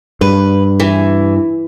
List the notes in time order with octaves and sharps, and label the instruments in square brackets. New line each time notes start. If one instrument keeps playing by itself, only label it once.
[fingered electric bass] G2 [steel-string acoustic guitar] B4
[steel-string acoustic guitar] E3